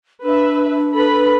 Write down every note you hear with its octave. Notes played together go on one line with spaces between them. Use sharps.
D4 B4 E5
A4 B4 B5